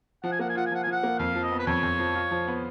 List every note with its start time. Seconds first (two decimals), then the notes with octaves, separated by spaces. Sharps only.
0.23 F3 F#5
0.32 G#5
0.39 A#3 F#5
0.49 G#5
0.55 F4 F#5
0.66 G#5
0.71 F3 F#5
0.83 G#5
0.87 F3 F#5
1.03 A#3
1.19 F2 F5
1.35 F3
1.43 D#5
1.51 B3
1.59 B4
1.67 F2 C#5
1.83 F2
1.99 F3
2.15 F4
2.31 F3
2.48 B3